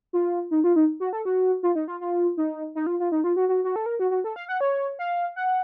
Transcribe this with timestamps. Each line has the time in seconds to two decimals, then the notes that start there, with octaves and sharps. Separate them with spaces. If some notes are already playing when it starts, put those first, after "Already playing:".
0.13 F4
0.51 D#4
0.64 F4
0.76 D#4
1.00 F#4
1.13 A4
1.25 F#4
1.63 F4
1.75 D#4
1.88 F4
2.01 F4
2.37 D#4
2.75 D#4
2.87 F4
3.00 F4
3.12 D#4
3.24 F4
3.36 F#4
3.49 F#4
3.64 F#4
3.76 A4
3.86 A#4
4.00 F#4
4.11 F#4
4.24 A4
4.36 F5
4.49 F#5
4.61 C#5
4.99 F5
5.36 F#5